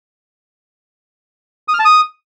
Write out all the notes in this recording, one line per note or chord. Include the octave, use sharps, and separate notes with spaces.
D#6
F6
A5
D#6